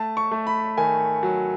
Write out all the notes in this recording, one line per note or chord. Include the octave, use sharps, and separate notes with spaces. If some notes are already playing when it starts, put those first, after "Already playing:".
Already playing: A3 A5
C#6
A3
B5
D#3 G#5
F#3